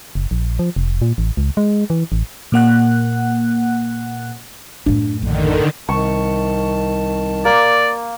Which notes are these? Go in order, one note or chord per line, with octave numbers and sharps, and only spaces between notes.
F#1
A#1
F3
F1
A#2
A1
C#2
G#3
E3
A1
A#2 A#3 F#5 F#6
F#2 A2 D4
A#1 D3 D#3
C2 D#3 A5 C#6
A#3 D5